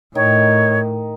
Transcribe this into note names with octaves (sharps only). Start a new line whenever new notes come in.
A2 D#3 C#5